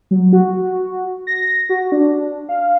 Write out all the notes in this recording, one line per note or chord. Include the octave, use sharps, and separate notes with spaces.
F#3
F#4
A#6
F#4
D4
F5